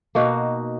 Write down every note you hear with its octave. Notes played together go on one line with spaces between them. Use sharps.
B2 A#3 D#4 F#4